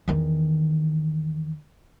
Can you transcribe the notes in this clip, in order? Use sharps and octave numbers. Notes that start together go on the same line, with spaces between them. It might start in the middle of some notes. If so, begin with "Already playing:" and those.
E2 D#3